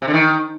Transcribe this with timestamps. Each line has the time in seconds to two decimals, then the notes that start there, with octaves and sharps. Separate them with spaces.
0.02 C3
0.08 D3
0.13 D#3